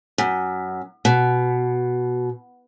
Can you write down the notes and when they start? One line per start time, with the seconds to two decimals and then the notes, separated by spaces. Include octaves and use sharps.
0.18 F#2
1.05 B2